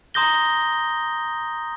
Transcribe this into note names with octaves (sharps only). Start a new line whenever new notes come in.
A#5 C6 D#6 G6 A#6 G7